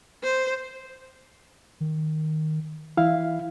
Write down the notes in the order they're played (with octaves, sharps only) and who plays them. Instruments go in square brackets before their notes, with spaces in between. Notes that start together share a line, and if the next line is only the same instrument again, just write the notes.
[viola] C5
[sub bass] D#3
[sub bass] E3 [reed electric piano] E4 F5